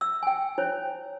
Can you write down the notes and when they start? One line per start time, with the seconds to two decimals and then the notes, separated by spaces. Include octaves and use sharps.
0.01 E5 E6
0.23 G5 G#5
0.58 E4 C5 C#5 G#5